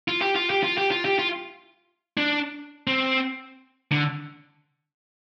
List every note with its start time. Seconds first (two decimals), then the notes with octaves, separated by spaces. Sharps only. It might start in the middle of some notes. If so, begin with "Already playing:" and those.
0.08 F4
0.21 G4
0.35 F4
0.50 G4
0.63 F4
0.78 G4
0.91 F4
1.05 G4
1.19 F4
2.17 D4
2.87 C4
3.92 D3